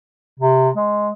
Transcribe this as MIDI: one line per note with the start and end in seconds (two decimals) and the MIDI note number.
0.40 0.69 48
0.77 1.10 56